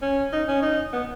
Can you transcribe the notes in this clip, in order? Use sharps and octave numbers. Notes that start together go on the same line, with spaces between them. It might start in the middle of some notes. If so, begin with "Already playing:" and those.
C#4
D#4
C#4
D#4
B3